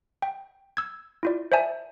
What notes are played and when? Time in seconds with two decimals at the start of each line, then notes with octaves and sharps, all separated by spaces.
0.22 G5
0.77 E6 G#6
1.23 E4 F4 D5
1.52 C5 D5 E5 G#5 A5